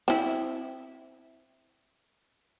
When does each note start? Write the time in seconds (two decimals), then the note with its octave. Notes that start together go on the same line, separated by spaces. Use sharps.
0.08 C4 E4